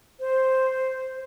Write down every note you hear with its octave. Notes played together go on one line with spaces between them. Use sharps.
C5